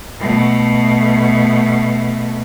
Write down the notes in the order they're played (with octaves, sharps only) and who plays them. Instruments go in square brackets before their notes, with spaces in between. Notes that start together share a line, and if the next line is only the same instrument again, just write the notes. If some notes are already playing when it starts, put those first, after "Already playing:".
[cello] B2 A3